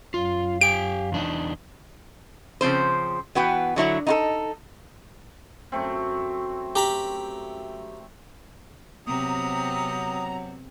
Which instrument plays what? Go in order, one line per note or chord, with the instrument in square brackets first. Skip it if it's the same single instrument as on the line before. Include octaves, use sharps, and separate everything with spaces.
[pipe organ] F#2 F#3 F5 [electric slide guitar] F4
[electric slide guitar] G4 G#5 [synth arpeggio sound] D7
[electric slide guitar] E2 D4 D#4
[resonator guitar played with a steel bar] C#3 F3 C4 C5
E3 B3 F#4 B4 G5
D3 F#3 E4 F#4
D#4 F4 A4
[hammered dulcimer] F#2 A3 C4
[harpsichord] G4 A#5 B5
[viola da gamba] C3 B3 C4 [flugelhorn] F#3 [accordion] A#5 [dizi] D#6